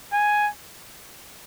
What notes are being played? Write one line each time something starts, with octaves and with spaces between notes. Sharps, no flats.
G#5